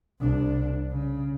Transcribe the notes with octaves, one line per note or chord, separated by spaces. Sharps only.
C2 D4
C#3